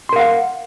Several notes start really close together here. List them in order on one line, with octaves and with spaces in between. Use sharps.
C6 A#4 F5 F#5